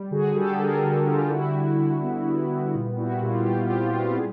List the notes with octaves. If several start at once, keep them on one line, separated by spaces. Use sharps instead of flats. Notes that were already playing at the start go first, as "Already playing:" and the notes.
Already playing: G3
D3 F#4 G#4
G3 G4 A4
G3 G#4 A#4
D3
D3 F4 G4
G3 E4 F#4
G3
D3
B3
B3
G3
A#2 F4
G3 E4 F#4
A#2 F4 G4
G3 F4 G4
C4 F4 G4
G3 F4 G4
G4
G#4